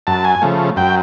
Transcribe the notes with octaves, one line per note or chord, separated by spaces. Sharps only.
F#2 A5
G#5
C#3 F3 A3
F#2 G5